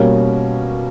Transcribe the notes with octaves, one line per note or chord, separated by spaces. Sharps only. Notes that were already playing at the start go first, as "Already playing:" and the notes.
Already playing: B2 G3 A#3 C#4